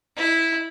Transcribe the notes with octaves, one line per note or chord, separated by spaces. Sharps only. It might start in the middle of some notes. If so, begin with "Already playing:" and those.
E4